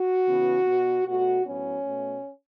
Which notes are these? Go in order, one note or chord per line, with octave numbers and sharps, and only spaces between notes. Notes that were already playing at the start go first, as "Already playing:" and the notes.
Already playing: F#4
C#3 E3 B3
B2 B3
B2 A3 F#4
A2 F#3 B3 C#4
B2 A3